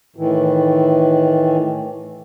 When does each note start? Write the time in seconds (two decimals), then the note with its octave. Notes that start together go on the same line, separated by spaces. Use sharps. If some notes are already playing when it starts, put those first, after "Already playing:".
0.16 A2 D#3 E3